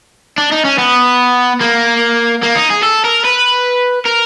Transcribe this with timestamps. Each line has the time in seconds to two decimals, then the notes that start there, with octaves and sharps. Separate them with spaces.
0.38 D4
0.51 D#4
0.65 C#4
0.78 B3
1.61 A#3
2.43 A#3
2.55 D#4
2.70 G#4
2.83 A4
3.04 A#4
3.24 B4
4.06 A#4